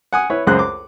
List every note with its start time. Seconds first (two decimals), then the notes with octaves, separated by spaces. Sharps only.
0.13 F#5 G#5 D#6
0.30 E4 B4 C#5
0.47 C#2 F#2 G#4 C5 F#6
0.59 D6